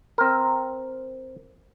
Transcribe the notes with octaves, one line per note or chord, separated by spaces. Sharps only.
C4 A#4